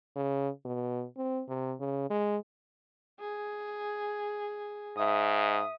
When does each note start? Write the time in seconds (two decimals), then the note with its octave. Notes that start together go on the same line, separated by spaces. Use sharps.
0.16 C#3
0.65 B2
1.17 C4
1.48 C3
1.80 C#3
2.10 G#3
3.20 G#4
4.98 G#2 E5 D#6